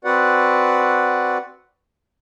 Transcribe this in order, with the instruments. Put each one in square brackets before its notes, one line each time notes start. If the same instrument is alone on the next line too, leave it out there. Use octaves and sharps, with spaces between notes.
[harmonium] C4 F#4 B4 D5 F#5